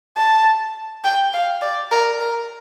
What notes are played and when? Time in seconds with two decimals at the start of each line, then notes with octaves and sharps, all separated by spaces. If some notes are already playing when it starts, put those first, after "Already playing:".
0.17 A5
1.04 G5
1.33 F5
1.62 D5
1.91 A#4
2.20 A#4